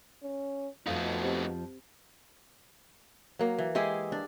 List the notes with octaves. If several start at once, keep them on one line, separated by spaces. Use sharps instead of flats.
C#4
F2 B2 F3 A3 D#4 F5
C4 G4 C5
F#3 A#3
E3
G#3 E4 G4 G#4
D4